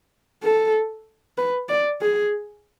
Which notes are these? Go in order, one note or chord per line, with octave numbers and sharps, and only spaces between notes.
A4
B4
D5
G#4